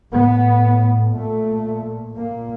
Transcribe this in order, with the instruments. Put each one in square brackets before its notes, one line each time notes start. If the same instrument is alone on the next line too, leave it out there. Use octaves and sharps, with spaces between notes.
[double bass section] A2 B3
A#2 A3
A#2 A#3